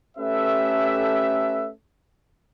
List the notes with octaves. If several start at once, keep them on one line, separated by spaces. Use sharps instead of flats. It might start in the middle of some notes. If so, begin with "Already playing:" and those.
A3 C#4 G4 A4 B4 E5